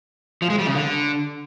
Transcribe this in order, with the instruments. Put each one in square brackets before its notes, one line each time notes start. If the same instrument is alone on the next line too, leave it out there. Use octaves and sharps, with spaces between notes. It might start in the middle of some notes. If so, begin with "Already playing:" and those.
[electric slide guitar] F3
G#3
G3
C#3
D3